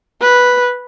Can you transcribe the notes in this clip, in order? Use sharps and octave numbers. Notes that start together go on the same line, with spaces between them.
B4